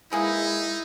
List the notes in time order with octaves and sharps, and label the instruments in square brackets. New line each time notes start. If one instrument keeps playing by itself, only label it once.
[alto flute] G#3 [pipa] A#3 G#4 B4 [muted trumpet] D#4 [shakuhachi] E4